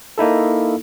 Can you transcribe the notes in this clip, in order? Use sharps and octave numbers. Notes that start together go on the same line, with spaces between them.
A#3 D#4 E4 A4